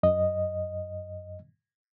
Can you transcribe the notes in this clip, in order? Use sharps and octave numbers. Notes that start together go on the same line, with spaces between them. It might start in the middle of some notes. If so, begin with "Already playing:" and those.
F#2 D#5